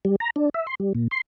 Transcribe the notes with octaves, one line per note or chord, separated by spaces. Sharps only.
G3
A#5
D4
E5
C6
G3
A#2
C6